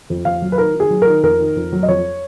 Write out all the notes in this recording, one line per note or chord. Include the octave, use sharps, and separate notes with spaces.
F2
F2 F5
F#3
B4
D#3 A#4
D#3
G#4
F#3
A#4
D#3
F2 A#4
D#3
F2
F#3
D#5
F2 C#5